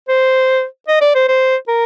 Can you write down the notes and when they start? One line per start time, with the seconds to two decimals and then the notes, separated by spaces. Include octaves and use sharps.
0.09 C5
0.88 D#5
1.02 D5
1.15 C5
1.28 C5
1.68 A#4